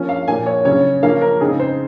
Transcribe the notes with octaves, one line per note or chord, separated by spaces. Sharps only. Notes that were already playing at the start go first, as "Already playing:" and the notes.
Already playing: F3 A#3 C#4
F5
A#2 F3 A#3 G#5
C#5
C#3 F#3 C#4 C#5
F3 A#3 C#4 F5
A#4
C#3 G#3 C4 D#4 G#4
C5